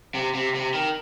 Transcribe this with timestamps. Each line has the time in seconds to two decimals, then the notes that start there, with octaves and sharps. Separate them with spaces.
0.15 C3
0.35 C3
0.55 C3
0.74 D#3